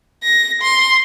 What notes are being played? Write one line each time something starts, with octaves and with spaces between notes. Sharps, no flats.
A#6
C6